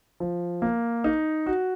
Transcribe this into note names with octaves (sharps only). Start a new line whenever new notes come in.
F3
A#3
D#4
F#4